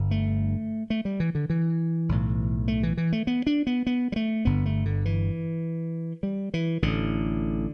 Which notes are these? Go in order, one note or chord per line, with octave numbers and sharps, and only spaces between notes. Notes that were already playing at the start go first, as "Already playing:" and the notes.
Already playing: G1 G2 D3
A3
A3
G3
E3
D3
E3
B1 A2
A3
E3
E3
A3
B3
D4
B3
B3
G3
A3
G1 G2 D3 B3
A3
D3
E3
G3
E3
A1 A2 D3